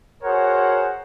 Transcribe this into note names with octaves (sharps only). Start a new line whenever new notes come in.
F#4 G#4 A#4 C5 C#5 F#5